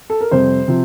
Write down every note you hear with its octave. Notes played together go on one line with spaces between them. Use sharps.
A4
A#4
F2 C3 G3 C5
C3 F3